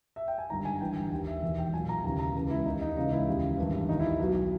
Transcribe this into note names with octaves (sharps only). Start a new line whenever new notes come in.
E5
G5
G#5
G1 G2 D#3 A#5
G#5
G#1 G2 E3 G5
G5
D#2 D#3 G5
E5
E1 E2 D#3 E5
G5
B1 A#2 G#5
A#5
E1 D#2 C#3 E3 A#5
A#5
C#2 C#3 E3
E4
D#2 D#3 D#4
D#4
C#2 C#3 E3 D#4
E4
E1 D#2 C#3
G#1 G2 E3
D#2 D#3 D#4
E4
B1 B2